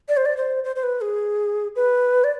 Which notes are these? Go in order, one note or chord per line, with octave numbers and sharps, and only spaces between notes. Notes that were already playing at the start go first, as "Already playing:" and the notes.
D5
C5
D5
C5
C5
C5
B4
G#4
B4
D5